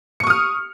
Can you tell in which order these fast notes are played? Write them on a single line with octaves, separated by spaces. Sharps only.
C#7 C#6 D#6 F6